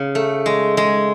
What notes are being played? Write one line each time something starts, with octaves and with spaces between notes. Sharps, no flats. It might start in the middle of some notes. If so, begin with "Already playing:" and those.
Already playing: C#3
A3
G#3
G#3